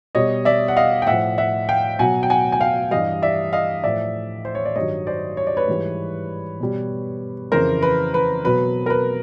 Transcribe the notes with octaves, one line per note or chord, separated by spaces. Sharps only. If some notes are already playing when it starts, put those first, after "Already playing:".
B2 G3 C#5 D#5
D5 E5
F#5
D#5 F5
G5
A2 F3 E5 F#5
E5 F#5
F5 G5
B2 F#3 F#5 G#5
G5
F#5 G#5
G#5
F5 G5
G2 E3 G3 D#5 F5
D5 E5
D#5 F5
A2 F3 D5 E5
C5
C#5
D5
G2 D#3 F#3 C#5 D#5
C5 D5
C#5
D5
B4 C#5
G#2 E3 G3
B2 G3
F2 C#3 E3 A#4 C5
B4
B4
B2 F#3 B4
A#4
B4